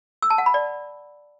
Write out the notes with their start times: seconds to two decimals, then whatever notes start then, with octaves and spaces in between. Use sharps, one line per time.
0.22 E6
0.30 A5
0.38 F#5
0.46 B5
0.54 D5